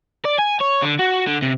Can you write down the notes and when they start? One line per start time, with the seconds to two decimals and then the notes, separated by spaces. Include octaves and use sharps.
0.25 D5
0.38 G#5
0.60 C#5
0.82 D3
0.99 F#4
1.27 D3
1.42 C3